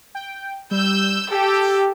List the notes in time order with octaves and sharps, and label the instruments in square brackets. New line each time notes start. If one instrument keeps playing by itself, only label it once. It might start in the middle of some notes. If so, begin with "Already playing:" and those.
[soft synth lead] G5
[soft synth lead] G3 [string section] E6 G6
[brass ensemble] G4 [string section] A4 G5 [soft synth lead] E6